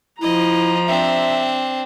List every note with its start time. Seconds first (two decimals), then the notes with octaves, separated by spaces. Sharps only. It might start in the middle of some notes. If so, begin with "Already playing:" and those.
0.22 F3 E4 D#5 A#5
0.88 C4 D4 E5